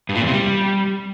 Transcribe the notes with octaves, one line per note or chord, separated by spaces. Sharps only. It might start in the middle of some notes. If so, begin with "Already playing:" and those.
G2
A#2
E2
C3
G3